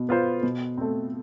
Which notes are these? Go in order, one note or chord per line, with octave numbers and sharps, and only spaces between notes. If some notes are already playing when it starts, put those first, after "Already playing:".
Already playing: B2
B3 F4 C5
B2
A3 C4